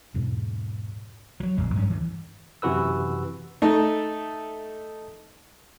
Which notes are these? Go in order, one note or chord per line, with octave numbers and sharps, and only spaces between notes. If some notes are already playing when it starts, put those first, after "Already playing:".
E2 G#2 B2
F3 F#3
A#1 E2 G#3
G2 F#3 C#4
D2 E3
F#2 C3 E3 F#4 B4 E6
A3 D#4